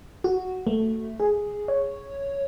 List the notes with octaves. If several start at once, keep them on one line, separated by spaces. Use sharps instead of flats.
F#4
A3
G#4
C#5